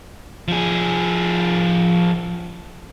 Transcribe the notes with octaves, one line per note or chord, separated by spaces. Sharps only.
F3 G#4